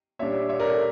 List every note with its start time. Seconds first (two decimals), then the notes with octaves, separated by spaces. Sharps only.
0.19 A#2 G3 D4 C#5 E5
0.49 C#5 E5
0.60 A#4 D5
0.69 A4 C#5